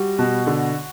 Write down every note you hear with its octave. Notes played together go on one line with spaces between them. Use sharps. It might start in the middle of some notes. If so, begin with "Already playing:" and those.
Already playing: G3 F#4
B2
D3